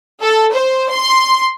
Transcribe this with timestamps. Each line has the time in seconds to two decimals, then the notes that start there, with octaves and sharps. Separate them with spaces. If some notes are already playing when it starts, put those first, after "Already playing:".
0.22 A4
0.54 C5
0.91 C6